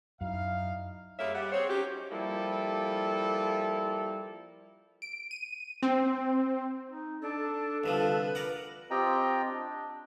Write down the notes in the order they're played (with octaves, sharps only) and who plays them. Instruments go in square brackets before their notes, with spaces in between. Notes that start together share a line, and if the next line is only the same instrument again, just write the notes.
[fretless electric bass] F#2 [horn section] D#4 E4 F5
[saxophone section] G3 G#3 A#3 A#4 C#5 E5
G3 G4 F#5
C4 G#4 C5 C#5
C#4 D#4 F#4 G4
[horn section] F3 G3 A#3 E4 A4
[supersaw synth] D7
D#7
C4
[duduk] D#4
[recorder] D4 [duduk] A4
[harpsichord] C2 D3 F3 [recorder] B4
[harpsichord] A#4 D5 F#5
[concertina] C4 F4 G4 D#5 G5 A#5
D4